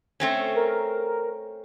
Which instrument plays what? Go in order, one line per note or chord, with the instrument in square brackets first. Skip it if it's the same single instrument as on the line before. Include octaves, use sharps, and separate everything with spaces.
[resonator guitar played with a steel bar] A3 C4 C#4
[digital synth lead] A#4